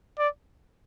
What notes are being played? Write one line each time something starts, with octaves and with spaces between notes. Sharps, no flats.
D5